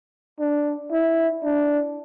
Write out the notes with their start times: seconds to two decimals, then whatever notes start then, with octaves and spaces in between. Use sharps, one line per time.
0.40 D4
0.92 E4
1.44 D4